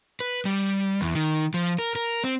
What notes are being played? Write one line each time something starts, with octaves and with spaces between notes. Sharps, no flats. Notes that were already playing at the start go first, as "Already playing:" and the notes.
B4
G3
E2
D#3
F3
A#4
A#4
C4